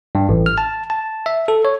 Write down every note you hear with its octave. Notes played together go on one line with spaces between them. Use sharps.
G2
A1
F6
A5
A5
E5
A4
C#5